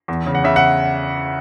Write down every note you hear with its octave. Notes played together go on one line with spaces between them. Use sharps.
E2
C#3
F#5
C#3 E5
F#5